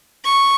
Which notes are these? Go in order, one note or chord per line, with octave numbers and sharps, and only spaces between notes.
C#6